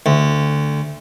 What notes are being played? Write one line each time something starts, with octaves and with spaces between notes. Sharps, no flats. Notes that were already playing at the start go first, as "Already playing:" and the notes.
D2